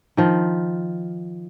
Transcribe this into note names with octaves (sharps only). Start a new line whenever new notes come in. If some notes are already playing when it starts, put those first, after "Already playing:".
D#3 F3